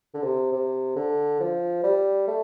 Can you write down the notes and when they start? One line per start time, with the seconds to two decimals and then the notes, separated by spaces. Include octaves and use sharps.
0.14 D3
0.23 C3
0.52 C3
0.96 D3
1.40 F3
1.83 G3
2.27 A3